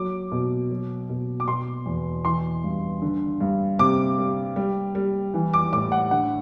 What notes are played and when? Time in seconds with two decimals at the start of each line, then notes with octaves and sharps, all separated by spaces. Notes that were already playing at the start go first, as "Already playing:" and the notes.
Already playing: F#3 D6
0.32 B2
0.70 F#3
1.09 B2
1.40 D6
1.48 B2 C6
1.86 E2
2.25 E3 C6
2.64 G2
3.02 D3
3.40 G2
3.79 C3 D6
4.18 G3
4.56 G3
4.95 G3
5.34 E3
5.54 D6
5.72 A2 D6
5.92 F#5
6.11 D3 F#5